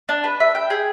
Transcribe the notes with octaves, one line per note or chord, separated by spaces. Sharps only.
D4
B4
E5
G5
G#4